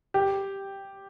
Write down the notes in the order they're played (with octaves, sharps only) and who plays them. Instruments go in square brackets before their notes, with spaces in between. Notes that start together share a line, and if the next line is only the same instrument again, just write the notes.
[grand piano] G4